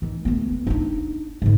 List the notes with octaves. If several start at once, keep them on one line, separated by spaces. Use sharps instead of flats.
D#3 E3
D2 B3
D4 D#4
G#2 D3